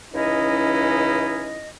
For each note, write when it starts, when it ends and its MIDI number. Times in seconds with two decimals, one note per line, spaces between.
0.13 1.68 37
0.13 1.68 52
0.13 1.68 61
0.13 1.68 63
0.13 1.68 64
0.13 1.68 75